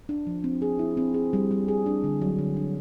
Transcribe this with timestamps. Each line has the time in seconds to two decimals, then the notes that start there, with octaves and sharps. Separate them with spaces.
0.09 D4
0.27 F3
0.44 C4
0.62 G#4
0.79 E4
0.97 C4
1.14 G#4
1.33 G3
1.51 G3
1.68 G#4
1.86 D4
2.04 D3
2.22 F#3
2.39 D3
2.57 D4